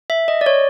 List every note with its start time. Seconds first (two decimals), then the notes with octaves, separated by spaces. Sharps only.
0.10 E5
0.28 D#5
0.41 D5
0.46 C#5